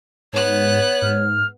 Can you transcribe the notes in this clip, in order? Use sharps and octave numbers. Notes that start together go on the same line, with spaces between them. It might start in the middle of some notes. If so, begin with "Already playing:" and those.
G#2 B3 C#5 F#6
G#2 F6